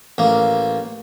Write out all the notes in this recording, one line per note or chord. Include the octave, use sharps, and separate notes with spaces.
A1 A#3